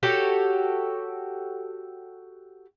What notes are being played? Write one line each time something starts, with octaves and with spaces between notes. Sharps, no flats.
F#4 G4 A4 C#5